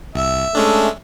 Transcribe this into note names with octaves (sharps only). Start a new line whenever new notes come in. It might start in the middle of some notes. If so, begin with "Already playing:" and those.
C2 E5
G#3 A3 C#4 D4